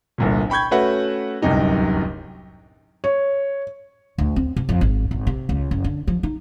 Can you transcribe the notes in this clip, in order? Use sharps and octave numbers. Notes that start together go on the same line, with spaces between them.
G1 C2 A#2
G5 B5 C#6 G6 G#6
A3 C#4 F#4 B4 E5 F#5
D1 C2 F#2 C3 D#4 G4
C#5
D2
C4
C3
F2
G#1
G#1
C3
C#2
F#1
D3
F3
D#4